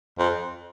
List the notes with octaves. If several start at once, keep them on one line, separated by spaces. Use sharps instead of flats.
F2